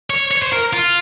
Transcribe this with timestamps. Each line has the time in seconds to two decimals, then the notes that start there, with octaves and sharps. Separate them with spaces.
0.10 C#5
0.31 C#5
0.42 C5
0.53 A#4
0.73 F4